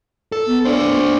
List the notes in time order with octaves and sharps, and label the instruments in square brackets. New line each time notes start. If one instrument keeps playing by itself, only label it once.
[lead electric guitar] A4
[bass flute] B3
[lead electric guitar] D4 C5